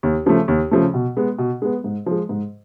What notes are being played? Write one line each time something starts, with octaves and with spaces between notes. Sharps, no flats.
D#2
C#3 F3 A3
D#2
C#3 F3 A3
B2
G#3 B3
B2
G#3 B3
G#2
F3 G#3
G#2